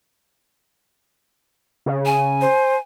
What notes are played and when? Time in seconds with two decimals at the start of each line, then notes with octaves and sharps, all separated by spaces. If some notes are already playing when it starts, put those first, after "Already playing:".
1.86 C#3
2.06 G#5
2.41 C5